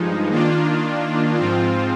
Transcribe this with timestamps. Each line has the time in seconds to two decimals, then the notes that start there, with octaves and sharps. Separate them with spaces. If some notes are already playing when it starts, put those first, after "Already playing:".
Already playing: G2 F3 G#3 D#4
0.29 D#3 A#3 D4 F4
1.36 G#2 F3 C4 F4